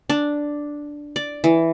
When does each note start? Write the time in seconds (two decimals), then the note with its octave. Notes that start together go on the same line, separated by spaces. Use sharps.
0.10 D4
1.16 D5
1.44 E3